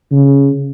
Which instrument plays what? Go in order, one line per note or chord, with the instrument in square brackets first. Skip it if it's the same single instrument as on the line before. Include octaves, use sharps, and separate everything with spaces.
[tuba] C#3